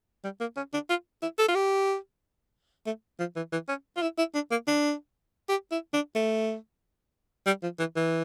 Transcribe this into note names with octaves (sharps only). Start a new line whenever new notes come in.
G3
A#3
C#4
D4
F4
E4
A4
F4
G4
A3
F3
E3
E3
C#4
F4
E4
E4
D4
A#3
D4
G4
E4
D4
A3
G3
F3
E3
E3